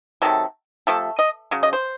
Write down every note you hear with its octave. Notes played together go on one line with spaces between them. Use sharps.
C3 D#3 F#3 A4
C3 F3 A3 A4
D#5
C#3 F#3
D#5
C5